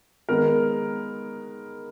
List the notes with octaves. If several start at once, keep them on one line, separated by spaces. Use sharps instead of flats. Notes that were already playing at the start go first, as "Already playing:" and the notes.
D#3 G#3 B3 D#4 A#4